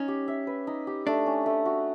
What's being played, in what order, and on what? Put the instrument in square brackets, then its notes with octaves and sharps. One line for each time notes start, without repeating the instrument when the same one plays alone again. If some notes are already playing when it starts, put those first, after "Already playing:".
Already playing: [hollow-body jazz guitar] C#4 [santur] D#4
[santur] G4
E5
B4
D#4
G4
[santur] A3 [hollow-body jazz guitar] D4
[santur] C#4
A3
F#4